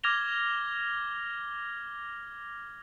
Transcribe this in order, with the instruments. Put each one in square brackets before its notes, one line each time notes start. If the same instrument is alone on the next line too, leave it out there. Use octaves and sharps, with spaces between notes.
[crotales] D6 F6 G#6 A#6 F7 G7